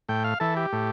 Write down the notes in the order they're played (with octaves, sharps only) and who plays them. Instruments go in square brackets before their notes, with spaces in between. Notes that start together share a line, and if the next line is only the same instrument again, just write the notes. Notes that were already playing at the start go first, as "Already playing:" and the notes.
[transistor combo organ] A2 G5
F5
E3 A4
G4
A2